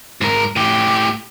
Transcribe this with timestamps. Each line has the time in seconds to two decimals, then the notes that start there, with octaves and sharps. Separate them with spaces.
0.21 G#2 A#4
0.56 A2 G4